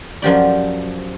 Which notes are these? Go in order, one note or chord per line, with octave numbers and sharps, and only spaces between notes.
F#2 F3 G4 D5